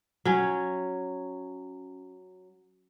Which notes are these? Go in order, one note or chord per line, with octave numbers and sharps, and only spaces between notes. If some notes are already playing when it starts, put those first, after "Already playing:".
F#3 C#4